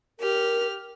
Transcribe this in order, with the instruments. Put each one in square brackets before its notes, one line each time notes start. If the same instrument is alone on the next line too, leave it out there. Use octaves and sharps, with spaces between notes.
[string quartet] G4 F6 [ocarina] A#4